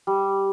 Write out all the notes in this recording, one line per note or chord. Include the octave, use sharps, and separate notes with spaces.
G3